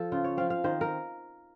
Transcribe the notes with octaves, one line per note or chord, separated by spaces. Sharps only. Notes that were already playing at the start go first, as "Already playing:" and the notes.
Already playing: F3 A4
C#3 F4
C#5
F3 C4 F5
F5
D#3 C5
A#4